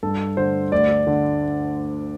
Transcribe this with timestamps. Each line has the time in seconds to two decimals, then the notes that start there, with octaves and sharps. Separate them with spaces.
0.03 G2 A4
0.37 D3 C5
0.72 D2 D5
1.07 D3